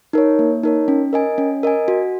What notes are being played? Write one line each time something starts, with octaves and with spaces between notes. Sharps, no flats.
D#4 A#4 C#5
A#3
D#4 A#4 C#5
C#4
A#4 D#5 G#5
C#4
A#4 D#5 G#5
F#4